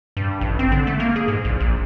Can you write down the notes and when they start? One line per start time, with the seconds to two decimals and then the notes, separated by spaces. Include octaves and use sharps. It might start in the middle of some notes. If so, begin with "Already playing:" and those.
0.17 G2
0.41 A1
0.59 C4
0.72 D3
0.87 A3
1.00 A#3
1.16 G#4
1.28 G#2
1.45 A#1
1.60 A#1